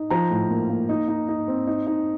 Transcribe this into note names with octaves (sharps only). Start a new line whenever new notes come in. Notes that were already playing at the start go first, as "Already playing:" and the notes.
Already playing: D#4
F3 A#5
A2
A#3
A#3
D#4
D#4
D#4
C4
D#4
D#4